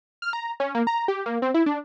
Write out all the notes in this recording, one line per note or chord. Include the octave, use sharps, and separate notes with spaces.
F6
A#5
C#4
A#3
A#5
G4
A#3
C4
E4
D4